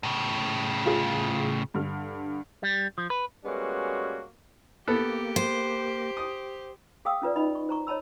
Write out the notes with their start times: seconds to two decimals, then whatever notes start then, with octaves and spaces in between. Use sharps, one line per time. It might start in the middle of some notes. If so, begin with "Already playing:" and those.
0.03 A2 C#3
0.86 F4 G#4
1.74 G2 D3 F6
2.63 G3
2.98 F3
3.10 B4
3.45 G3 G#3 A#3 B3 C#4 F#4
4.88 A#3 B3 G4 A4
5.36 C5
6.17 D#6
7.05 G#4 F5 G5 D#6 E6
7.22 C#4 F4 B4 D5
7.36 D#4 D#5 B5
7.55 C#6
7.69 C5 A#5 C#6
7.87 C#5 D#5 A5 B5 E6